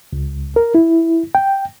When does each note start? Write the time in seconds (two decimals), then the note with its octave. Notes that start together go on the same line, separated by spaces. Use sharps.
0.13 C#2
0.56 A#4
0.75 E4
1.35 G5